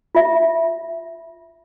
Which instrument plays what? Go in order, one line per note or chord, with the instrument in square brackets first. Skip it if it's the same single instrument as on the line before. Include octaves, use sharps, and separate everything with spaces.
[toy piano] F4 E5